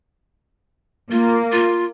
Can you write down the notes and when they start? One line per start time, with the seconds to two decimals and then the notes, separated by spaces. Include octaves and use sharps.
1.11 A#3 F4
1.52 F4